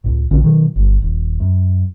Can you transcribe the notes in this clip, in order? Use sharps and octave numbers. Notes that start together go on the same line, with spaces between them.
C#2 A2
A#1 D3 C#4
B2 D#3 F#3
G1 G2
D#1
F#2